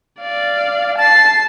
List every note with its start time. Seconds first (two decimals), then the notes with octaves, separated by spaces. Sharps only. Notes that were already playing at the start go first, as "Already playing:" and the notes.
0.21 D5 F5
0.98 A5 A6 C7